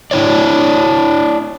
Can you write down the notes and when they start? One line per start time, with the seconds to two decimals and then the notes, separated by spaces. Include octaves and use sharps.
0.11 D4 E4 C#5 D5